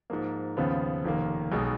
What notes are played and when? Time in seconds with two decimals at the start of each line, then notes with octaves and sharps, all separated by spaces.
0.10 G#2 F3 A#3
0.57 D#2 C#3 F3 B3
1.04 F1 D#2 D#3 A#3
1.52 B1 B2 G#3